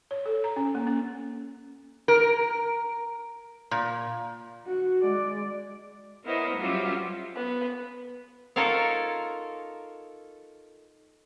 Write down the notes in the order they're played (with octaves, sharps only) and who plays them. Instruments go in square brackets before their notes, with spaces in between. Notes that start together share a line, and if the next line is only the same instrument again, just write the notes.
[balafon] C#5
A4
A#5
C#4
A#3
C#4
[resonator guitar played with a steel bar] A#4
A#2
[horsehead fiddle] F#4
G#3 D5
[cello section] B3 E4 A#4 C5 C#5 D#5
F#3 G3 C#4 F4 G4 E5
[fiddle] B3
[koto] D#4 F4 A4 A#4 C#5 F5